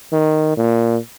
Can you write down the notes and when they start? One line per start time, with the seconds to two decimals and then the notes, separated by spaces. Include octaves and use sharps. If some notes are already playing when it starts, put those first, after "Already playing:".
0.12 D#3
0.57 A#2